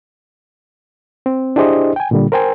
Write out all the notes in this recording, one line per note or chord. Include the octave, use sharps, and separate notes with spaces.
C4
D4 E4 G4 G#4 C5 D#5
G5 G#5
A#2 D3 G3
A#4 C5 G5 G#5